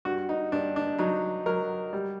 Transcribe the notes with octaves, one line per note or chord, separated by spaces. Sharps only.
G2 F#4
D#4
G2 D4
D4
F#3 D#4
F#3 A#4
G3